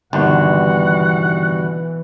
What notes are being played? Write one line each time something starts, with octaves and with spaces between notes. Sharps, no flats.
G1 D#2 B2 E3 G3 F#4 F#5